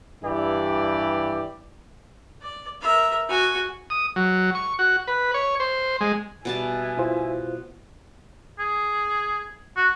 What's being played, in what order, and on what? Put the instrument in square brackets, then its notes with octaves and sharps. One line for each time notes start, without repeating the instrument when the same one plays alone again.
[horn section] G2 E3 E4 G4 D5
[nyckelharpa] D5
A#4 E5
F#4 G#5
[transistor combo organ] D#6
F#3
C#6
F#4
B4
C#5
C5
G#3
[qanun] B2 G3 A5 [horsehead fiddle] E5 G#5
[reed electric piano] E4 F4 C5
[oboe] G#4
F#4